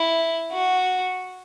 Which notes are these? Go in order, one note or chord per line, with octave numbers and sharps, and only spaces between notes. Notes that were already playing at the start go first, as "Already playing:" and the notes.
Already playing: E4
F#4